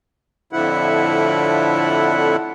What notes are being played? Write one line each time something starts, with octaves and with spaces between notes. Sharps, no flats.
F2 A2 D3 F3 E4 F#5